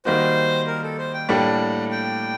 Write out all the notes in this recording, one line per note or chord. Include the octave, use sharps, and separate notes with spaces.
D#3 G3 A#3 D#4 F#4 C5
A#4
A4
C5
G5
A2 G3 A#3 D4 G4 F#5
G5